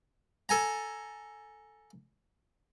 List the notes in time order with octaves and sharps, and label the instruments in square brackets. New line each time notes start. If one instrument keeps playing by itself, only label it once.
[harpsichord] A4 G#5 A#5